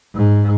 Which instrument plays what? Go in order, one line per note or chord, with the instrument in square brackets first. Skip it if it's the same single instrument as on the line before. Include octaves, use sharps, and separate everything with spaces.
[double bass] G#2